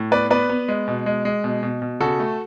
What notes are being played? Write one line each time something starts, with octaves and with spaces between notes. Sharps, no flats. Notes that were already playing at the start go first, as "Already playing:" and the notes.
Already playing: A2
B3 B4 D5
B3 B4 D5
B3
G#3
B2
G#3
G#3
B2
B2
B2
C#3 F#4 A4
A3